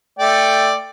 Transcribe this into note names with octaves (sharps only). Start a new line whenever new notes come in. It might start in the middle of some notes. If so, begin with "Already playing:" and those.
A3 D5 G5